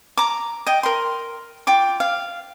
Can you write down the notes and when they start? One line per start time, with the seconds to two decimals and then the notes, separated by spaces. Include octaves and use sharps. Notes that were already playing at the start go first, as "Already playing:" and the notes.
0.17 A#5 D6
0.66 D#5 G5
0.83 A#4 C6
1.67 F4 G5 D6
2.00 F5